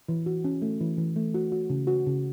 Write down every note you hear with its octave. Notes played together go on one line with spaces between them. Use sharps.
E3
F#4
C#4
A3
E3
E3
A3
F#4
F#4
C#3
F#4
C#3